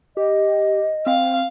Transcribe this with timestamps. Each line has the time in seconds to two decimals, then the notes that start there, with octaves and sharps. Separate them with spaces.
0.17 G4 D#5
1.06 C4 F5